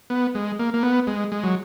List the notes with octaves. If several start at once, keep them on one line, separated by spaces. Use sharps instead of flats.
B3
G#3
A#3
A#3
B3
G#3
G#3
F#3